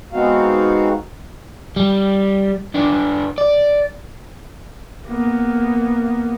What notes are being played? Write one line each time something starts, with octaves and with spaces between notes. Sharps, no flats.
G#3 B3 C4 D#4 F#4 F5
G3
B3 D4
D5
A#3 B3